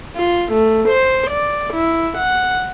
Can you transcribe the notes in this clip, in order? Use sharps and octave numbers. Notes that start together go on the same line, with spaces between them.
F4
A3
C5
D5
E4
F#5